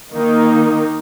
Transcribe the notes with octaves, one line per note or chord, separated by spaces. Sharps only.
D#3 A#3 D#4